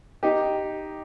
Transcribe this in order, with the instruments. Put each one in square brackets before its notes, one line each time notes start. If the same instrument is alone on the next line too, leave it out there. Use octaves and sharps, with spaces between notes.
[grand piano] D#4 G4